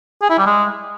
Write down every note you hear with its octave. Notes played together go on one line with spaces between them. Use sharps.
G#4
E4
G3
G#3